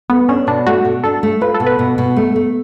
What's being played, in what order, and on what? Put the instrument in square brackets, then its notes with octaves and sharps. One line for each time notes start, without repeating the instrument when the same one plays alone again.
[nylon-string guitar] A3 [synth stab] B3
[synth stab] C#4 [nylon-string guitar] D4
[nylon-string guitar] B2 [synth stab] D4
[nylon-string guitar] A3 [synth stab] F#4
[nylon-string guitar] B2
[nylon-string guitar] D4 [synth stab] A4
[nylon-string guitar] A3
[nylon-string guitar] F4 [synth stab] B4
[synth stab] A4
[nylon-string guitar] B2
[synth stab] B4
[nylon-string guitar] B2
B2
A3
A3